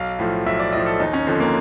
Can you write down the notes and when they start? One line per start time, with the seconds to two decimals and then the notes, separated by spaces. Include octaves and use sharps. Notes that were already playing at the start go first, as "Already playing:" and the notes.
Already playing: B1 F5
0.19 A2 F3
0.46 B1 E5
0.60 D5
0.73 A2 F3 D#5
0.86 A4
1.00 D#2 D#4
1.13 C#4
1.27 D3 F3 C4
1.40 A#3